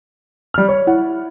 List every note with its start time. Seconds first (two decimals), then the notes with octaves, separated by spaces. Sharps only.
0.54 G3 F6
0.68 C#5
0.87 E4 F#5